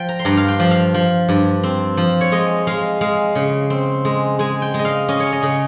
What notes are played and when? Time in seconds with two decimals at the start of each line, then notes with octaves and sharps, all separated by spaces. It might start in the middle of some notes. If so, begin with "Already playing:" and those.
Already playing: F3 G5
0.09 A#5
0.19 C6
0.25 G2 A#5
0.37 F5
0.48 G5
0.60 F3
0.71 F5
0.94 F3
1.29 G2
1.63 C4
1.97 F3
2.21 C#5
2.32 G#3 D#5
2.67 G#3 F5
3.01 G#3 F5
3.35 C#3
3.70 C4
4.05 G#3
4.39 G#3 G#5
4.62 G5
4.74 G#3
4.79 D#5
4.85 F5
5.08 C#4 D#5
5.20 C#5
5.32 D#5
5.43 C#3